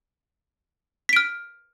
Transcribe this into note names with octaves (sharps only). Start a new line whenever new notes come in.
F6 B6 D7